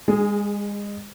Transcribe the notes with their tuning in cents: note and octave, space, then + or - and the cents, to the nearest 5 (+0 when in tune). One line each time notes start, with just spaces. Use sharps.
G#3 -30 G#4 +0